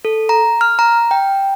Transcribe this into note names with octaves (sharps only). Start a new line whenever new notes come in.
A4
A#5
F6
A#5
G5